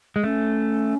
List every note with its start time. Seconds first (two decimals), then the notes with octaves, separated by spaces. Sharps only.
0.16 G#3
0.24 A3 C#4